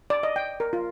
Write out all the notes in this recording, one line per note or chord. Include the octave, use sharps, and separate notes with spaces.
D5
D#5
G5
A#4
F4